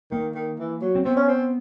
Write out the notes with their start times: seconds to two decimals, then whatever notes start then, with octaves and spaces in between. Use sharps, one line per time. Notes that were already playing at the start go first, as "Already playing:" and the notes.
0.11 D#3 A#3
0.35 D#3
0.59 E3
0.81 F#3
0.95 C4
1.05 B3 C4
1.17 C#4
1.28 C4